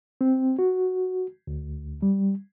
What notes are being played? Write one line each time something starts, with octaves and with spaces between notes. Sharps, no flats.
C4
F#4
D2
G3